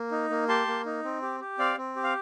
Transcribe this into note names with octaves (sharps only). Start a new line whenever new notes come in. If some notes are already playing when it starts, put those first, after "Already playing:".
Already playing: A#3
D#4
A#3
G4 A5 C6
A#3
D#4
C4
G4
G4
C4 D5 F5
C4
G4
F5